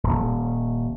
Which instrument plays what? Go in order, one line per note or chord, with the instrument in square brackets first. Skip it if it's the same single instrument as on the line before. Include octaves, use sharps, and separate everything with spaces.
[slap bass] D#1